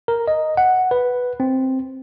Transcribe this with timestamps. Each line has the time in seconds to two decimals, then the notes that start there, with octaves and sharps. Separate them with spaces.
0.08 A#4
0.28 D#5
0.57 F#5
0.91 B4
1.40 C4